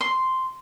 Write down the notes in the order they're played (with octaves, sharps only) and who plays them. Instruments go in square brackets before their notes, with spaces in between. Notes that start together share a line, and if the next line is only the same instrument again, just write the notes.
[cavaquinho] C6